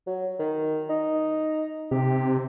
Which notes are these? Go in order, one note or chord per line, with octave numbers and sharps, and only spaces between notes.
F#3
D#3
D#4
C3 G4